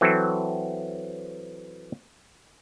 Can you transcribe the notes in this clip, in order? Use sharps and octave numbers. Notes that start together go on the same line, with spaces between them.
E3 F#3 C4 A4